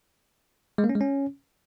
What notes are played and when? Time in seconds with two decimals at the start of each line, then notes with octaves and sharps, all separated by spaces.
0.78 G#3
0.84 A#3
0.89 C#4
0.95 G#3
1.01 C#4